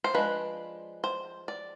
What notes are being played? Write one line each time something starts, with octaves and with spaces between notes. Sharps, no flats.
C5
F3 G#3 D4 B4
C5
D5